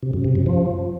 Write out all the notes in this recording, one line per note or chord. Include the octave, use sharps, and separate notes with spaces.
C3
F#2
C3
F#2
F3